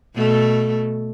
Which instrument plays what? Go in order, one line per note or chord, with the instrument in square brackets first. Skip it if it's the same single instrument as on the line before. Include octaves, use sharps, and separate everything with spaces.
[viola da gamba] B2 A3 A4